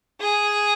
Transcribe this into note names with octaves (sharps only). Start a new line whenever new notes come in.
G#4